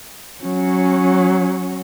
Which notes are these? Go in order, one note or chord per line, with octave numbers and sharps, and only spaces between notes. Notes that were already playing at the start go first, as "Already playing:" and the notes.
F#3 C#4